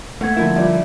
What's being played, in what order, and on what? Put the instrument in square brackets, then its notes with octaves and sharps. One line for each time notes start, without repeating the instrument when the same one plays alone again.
[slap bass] A3 [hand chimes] A#3 F#5 G#6
[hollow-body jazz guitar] D3 F3 E4 [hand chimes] A#4
[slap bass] G3 [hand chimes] F4 D5 E5